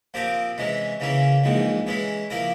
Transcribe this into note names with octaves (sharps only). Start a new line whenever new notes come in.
A#2 F3 C4 G4 A#4
C3 E3 G#3 C#4
C#3 E3 A#3 C#4 E4
A#1 G#2 E3 G#3
E3 G#3 C#4 E4
F3 A#3 E4 A#4